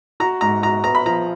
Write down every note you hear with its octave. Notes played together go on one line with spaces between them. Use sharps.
F#4 A#5
G#2 A#5
F#4 A#5
B3 A#5
B5
F3 A#5